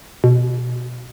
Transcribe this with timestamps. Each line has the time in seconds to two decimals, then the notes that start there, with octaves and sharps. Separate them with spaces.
0.24 B2